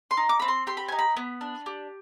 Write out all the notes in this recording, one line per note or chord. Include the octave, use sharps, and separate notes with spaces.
C6
D#4
D6
C4 B5
C6
G4 C6
B5
D#4 G#5
B5
B3
D4
G4